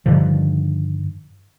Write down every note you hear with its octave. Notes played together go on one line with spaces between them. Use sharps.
G2 D3 D#3 F3